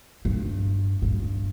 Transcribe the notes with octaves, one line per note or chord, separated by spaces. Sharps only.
G2
G2